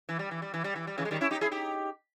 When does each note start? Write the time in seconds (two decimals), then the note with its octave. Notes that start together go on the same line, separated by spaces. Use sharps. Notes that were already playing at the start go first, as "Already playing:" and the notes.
0.09 E3
0.19 G3
0.31 E3
0.42 G3
0.54 E3
0.64 G3
0.76 E3
0.87 G3
0.98 C#3 E3
1.05 G#3
1.11 D#3 G3
1.21 C#4 E4
1.31 D#4 G4
1.41 E4 G#4
1.51 D#4 G4